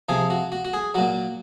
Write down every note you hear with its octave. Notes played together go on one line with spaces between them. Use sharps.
C3 F3 G#4
F#4
F#4
F#4
G#4
A#2 F#3 F#4